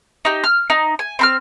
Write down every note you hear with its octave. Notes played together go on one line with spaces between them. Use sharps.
D#4 G4
F6
D#4
G#5
C4 B5 F6